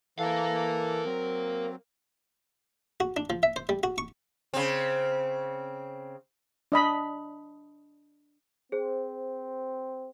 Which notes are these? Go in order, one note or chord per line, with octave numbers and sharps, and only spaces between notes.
E3 A4 A#4 F5
F#3 C4
F#4
D4
F3
E5
C5
G3
F#4
C#6
C#3 C4
D4 D#5 B5
C4 G#4 C5